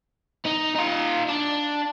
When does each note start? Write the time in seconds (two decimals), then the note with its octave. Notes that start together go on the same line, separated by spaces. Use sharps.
0.46 D#4
0.76 D#4 F4
1.29 D4